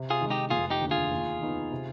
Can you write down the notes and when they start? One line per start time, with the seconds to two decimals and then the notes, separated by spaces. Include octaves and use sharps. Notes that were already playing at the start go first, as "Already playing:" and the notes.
Already playing: C3
0.10 F4 G#4
0.21 D#3 G#3
0.30 D#4 G4
0.50 F1 F4 G#4
0.70 D#4 G4
0.81 D#2 D3
0.91 F4 G#4
1.11 D#2
1.41 D#3 B3 D#4
1.71 C3